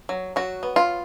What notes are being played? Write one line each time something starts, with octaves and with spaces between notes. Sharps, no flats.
F#3
F#3 F#4
B3
F4